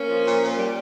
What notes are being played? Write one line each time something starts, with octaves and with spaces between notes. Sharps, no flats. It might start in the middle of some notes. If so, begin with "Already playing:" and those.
Already playing: A#3 C#4
F3
A#2
A#2
G3